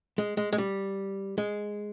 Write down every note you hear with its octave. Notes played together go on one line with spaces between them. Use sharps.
G#3
G#3
G#3
G3
G#3